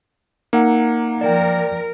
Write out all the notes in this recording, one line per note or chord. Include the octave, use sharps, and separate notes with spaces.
A#3 D#4 F#5
F3 A#4 D5 G5